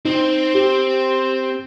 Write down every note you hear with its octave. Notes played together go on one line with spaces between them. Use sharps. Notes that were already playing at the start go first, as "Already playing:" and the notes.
C4 D#4 C5
G4